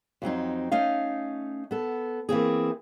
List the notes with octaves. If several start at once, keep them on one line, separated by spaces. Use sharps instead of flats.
F2 F#3 C4 D#4
A3 C#4 D#4 F5
B3 A4
E3 A#3 C4 G#4